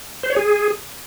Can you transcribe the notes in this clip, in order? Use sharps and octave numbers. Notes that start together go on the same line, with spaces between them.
C5
C#5
G#4